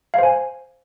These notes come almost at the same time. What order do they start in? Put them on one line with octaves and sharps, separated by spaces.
F5 C5 G#5